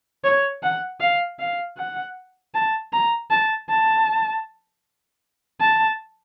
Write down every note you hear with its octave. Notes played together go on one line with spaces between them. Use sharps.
C#5
F#5
F5
F5
F#5
A5
A#5
A5
A5
A5